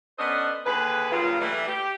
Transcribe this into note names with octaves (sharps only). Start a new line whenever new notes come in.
B3 C#4 D4 A4 C5 D#5
D#2 D3 G#4 B4
G2 A#2 C#3 F#3 F4
E3 G3 A3
G4